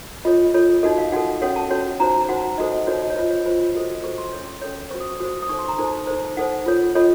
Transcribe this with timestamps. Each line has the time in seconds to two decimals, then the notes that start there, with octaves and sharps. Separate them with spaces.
0.25 F4 A4 C#5 D#5
0.54 F4 A4 C#5
0.83 D#4 F#4 A4 D#5
0.98 F5
1.12 D#4 F#4 A4 F#5
1.42 C#4 F#4 A4 C#5 F#5
1.56 A5
1.71 C#4 F#4 A4 C#5
2.00 D#4 F#4 C5 A#5
2.29 D#4 F#4 C5 F#5
2.58 D#4 F#4 A4 C5 D#5
2.72 D#5
2.87 D#4 F#4 A4 C5 C#5
3.02 D#5
3.10 C#5
3.16 F4 C5 D#5
3.31 C#5
3.46 F4 C5
3.75 F#4 A4 C5 D#5
4.04 F#4 A4 C5 C#6
4.18 C6
4.33 C#4 A4 C#5
4.61 C#4 A4 C#5
4.91 F#4 C5 C#6
5.00 D#6
5.10 C#6
5.20 F#4 C5 D#6
5.42 D#6
5.49 D#4 A4 C5 C#6
5.59 C6
5.68 A#5
5.79 D#4 A4 C5
6.07 D#4 A4 C5
6.37 D#4 A4 C5 F#5
6.66 F4 A4 C#5
6.95 F4 A4 C#5 D#5